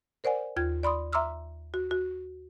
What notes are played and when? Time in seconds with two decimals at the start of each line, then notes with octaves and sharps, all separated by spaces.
0.24 A#4 C5 D5 F#5 G#5
0.56 D#2 F4 G#6
0.83 D5 B5 C6 D#6
1.13 E5 A#5 C6 D6 E6 F6
1.74 F#4
1.91 F#4